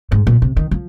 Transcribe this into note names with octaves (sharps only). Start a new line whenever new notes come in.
G#2
A#2
C3
D#3
F3